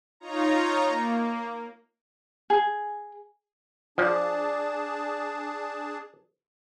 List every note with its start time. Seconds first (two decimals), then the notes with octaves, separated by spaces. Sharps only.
0.20 D#4 F4 C#5 A#5
0.86 A#3
2.50 G#4
3.98 F3 D4 G#4 D5 A5